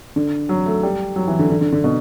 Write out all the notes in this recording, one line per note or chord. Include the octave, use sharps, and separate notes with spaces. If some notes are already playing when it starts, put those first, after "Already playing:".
D3
F#3
A3
G3
F#3
E3
D3
D3
D3
D3
B2